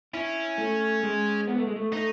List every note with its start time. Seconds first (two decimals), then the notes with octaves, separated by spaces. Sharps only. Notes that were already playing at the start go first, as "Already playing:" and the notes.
0.14 C#4 E4
0.58 A3
1.03 G#3
1.47 B3
1.58 A3
1.67 G#3
1.76 A3
1.93 A3 D#4